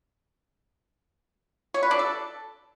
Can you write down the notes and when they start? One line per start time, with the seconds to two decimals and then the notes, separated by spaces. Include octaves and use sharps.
1.74 C#5
1.83 B4
1.91 D4
1.99 A4